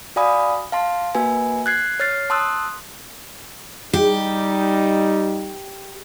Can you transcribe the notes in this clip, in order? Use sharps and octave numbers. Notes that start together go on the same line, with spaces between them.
F#4 D5 F5 G#5 B5 D#6
F5 A5 C6
A#3 F#4 B4 G#5
F#6 G#6 C7
C#5 F6 A6 C7
A5 C6 D#6 E6 F#6
G3 D#4 G4